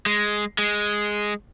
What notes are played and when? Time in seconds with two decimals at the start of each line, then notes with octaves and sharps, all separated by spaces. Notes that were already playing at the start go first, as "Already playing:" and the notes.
0.06 G#3
0.58 G#3